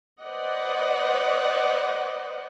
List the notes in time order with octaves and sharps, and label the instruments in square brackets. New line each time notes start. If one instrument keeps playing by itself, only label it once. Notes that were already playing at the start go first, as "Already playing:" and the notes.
[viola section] B4 C5 D5 D#5 F#5